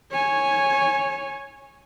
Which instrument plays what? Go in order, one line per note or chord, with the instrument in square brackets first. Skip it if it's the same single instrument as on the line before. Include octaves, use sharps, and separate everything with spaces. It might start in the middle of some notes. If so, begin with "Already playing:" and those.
[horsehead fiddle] C#5 G#5